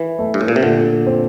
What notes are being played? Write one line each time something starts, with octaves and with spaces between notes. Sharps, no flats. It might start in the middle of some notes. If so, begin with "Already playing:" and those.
Already playing: E3 E4
A3
G2
A2
A#2
C3
A#2 D3
C4